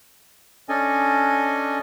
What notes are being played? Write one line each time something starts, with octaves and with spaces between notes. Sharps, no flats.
C#4 D4 A4 D#5 G#5